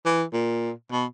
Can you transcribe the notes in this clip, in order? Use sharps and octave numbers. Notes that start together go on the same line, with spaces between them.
E3
A#2
B2